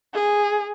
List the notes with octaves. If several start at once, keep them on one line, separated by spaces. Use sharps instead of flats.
G#4